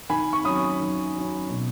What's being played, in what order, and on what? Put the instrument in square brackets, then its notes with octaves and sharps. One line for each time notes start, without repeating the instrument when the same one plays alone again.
[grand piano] D#3 G#5 B5
C#6
F#3 C#4 B5 D#6
D#3
F#3 C#4
B2